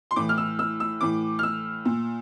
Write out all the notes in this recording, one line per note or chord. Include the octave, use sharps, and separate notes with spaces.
C6
A2 E3 D6
F6
E6
E6
E6
A2 E3 D6
F6
E6
A#2